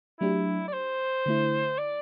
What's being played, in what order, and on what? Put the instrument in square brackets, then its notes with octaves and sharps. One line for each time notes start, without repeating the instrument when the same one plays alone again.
[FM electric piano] F#3 A3 D4 G4 [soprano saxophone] E4
[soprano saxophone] D5
C5
[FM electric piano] D3 A3 E4
[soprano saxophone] D5